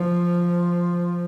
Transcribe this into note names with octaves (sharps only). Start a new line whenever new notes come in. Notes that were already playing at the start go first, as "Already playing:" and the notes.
Already playing: F3